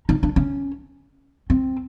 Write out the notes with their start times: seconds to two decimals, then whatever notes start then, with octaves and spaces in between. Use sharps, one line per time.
0.09 D#4
0.23 D4
0.36 C#4
1.50 C4